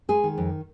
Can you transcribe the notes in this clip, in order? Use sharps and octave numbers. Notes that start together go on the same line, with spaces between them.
G#3 G#4
D#3
F2